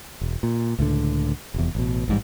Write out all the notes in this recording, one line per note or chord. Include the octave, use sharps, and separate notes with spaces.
E1
A#2
C#2 A2 D3
F1 E2
A1 B2
A1 G#2 G3